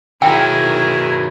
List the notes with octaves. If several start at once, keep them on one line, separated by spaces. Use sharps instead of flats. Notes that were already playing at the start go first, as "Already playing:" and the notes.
D#3 F#3 E4 G#4 A#4 G5